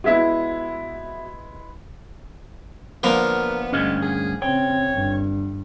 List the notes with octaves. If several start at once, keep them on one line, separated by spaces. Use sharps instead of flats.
G#3 B3 E4 F#4 E5
D3 F3 A#3 B3 A#4
D2 G2 G#3 C#4
G#4
C#3 C4 C#5 G5
G1 G2